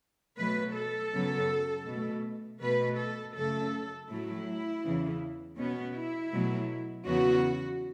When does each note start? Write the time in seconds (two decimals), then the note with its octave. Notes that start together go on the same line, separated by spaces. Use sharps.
0.38 B2 F#3 A3 B4
0.75 A4
1.13 F#2 C#3 F#3 B3
1.87 B2 A3
2.61 B2 A3 B4
2.98 A4
3.35 F#2 C#3 A3 A4
4.09 A2 F#3 A3 E4
4.83 E2 C#3 E3
5.57 B2 B3 C#4
5.94 E4
6.31 B2 F#3 A3
7.06 E2 C#3 F#3 B3 F#4